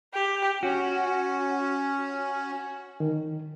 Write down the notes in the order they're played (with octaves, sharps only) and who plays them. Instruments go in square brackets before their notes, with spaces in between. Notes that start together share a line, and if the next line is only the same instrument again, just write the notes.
[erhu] G4
[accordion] C#4 [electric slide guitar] F#4
[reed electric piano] D#3